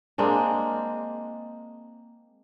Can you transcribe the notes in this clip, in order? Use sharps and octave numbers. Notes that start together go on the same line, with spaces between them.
G#3 A#3 C4 D4